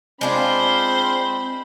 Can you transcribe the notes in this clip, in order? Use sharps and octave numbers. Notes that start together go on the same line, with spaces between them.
G#3 C4 D4 F4 C5 B5